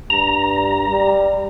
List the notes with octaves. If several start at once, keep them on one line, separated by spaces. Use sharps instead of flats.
G2 A#5
G3